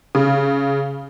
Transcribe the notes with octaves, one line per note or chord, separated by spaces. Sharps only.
C#3